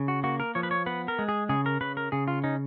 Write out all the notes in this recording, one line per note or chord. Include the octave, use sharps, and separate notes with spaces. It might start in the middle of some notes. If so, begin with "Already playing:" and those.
Already playing: C#3
F#4
A#3 F#4
A#4
F3 C#5
B4
C#5
B3 B4
A#4
G#3
G#4
C#3 G#4
A#4
C#3 B4
A#4
C#3 G#4
F4
C#4 D#4